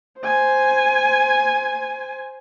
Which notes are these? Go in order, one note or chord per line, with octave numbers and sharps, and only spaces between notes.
C5 G#5